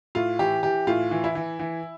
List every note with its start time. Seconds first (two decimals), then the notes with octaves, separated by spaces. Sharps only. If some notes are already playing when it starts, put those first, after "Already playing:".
0.15 A2 F4
0.39 E3 G4
0.63 E3 G4
0.87 A2 F4
1.11 E3
1.24 E4
1.35 E3
1.59 E3